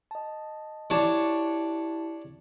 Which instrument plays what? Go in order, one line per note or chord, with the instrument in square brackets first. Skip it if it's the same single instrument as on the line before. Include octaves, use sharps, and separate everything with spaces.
[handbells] D#5 A5
[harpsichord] D4 C#5 [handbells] E4 G4 A5